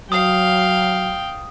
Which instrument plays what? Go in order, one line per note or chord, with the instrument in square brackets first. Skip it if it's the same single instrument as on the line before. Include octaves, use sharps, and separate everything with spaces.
[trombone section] F#3 [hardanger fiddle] F5 [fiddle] G5 [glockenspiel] D#6